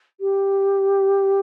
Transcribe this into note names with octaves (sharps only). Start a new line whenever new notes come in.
G4